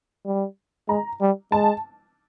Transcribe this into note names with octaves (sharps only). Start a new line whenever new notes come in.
G3
G#3 A#5
G3
G#3 A5